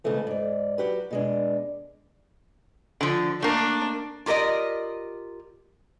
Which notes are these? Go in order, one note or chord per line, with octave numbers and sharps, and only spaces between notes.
C#3 E3 G#3 A3 C4
G#2 D5
F#3 F#4 G4 B4
B2 G#3 D4
D3 F3
A3 A#3 D4
F4 G4 A#4 D5 D#5